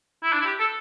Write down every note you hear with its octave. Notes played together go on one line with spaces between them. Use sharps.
E4
D4
E4
G4
A4